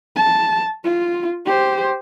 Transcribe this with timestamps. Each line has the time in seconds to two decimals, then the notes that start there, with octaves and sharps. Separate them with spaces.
0.16 A5
0.84 F4
1.46 G4 C5